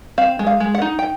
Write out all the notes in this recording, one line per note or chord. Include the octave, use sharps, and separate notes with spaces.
C4 F5
G#3
F5
G#3
F#5
D#4
G5